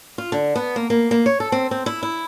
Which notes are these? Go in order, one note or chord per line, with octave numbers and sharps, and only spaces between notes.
F4
D3
B3
A#3
A#3
A#3
C#5
A4
C4
C4
E4
E4